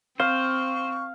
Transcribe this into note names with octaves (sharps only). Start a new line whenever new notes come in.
C4 C5 F5 C#6